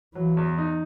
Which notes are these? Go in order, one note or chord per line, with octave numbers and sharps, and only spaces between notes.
E3 F#3
E2
D#4